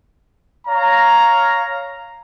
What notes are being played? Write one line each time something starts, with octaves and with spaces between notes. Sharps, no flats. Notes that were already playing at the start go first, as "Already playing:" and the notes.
C#5 F5 A#5